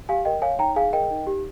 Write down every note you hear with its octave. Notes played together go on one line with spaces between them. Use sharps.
G4 F5 G#5
A#4 D#5 G5
C#5 F5 G#5
D#4 G5 A#5
G#4 F5 G#5
A#4 D#5 G5
D#4
G4